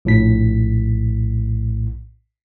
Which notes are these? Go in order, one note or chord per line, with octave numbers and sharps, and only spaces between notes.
A#1 A2 B6